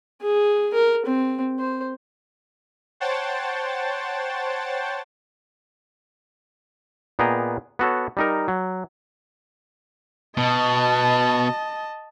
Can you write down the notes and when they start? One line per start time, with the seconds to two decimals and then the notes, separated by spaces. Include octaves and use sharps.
0.22 G#4
0.74 A#4
1.06 C4
1.59 C5
3.00 C5 C#5 F#5 G5 A5 A6
7.19 A#2 B3 G#4 D#5 G5 A#5
7.79 B3 F#4 A4 C#5
8.17 G3 D#4 A#4
8.48 F#3
10.37 B2 D#5 A5